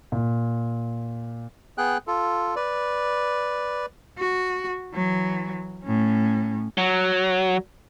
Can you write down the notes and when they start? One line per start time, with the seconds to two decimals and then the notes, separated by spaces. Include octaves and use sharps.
0.12 A#2
1.78 B3 G#4 G5 F#6
2.07 F4 A4
2.56 B4 D5
4.18 F#4
4.94 E3 F#3
5.84 A2 C#4
6.78 F#3